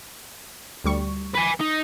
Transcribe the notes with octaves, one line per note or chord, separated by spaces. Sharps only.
D2 G3 C#6
B4 G#5
D#4